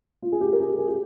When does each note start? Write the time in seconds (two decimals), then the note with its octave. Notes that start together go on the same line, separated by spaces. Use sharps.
0.22 F4
0.32 G#4
0.41 G4
0.53 A#4
0.60 G#4
0.70 G4
0.78 G#4
0.88 G4